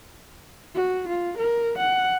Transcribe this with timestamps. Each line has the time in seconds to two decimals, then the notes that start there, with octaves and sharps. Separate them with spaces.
0.74 F#4
1.08 F4
1.38 A#4
1.78 F#5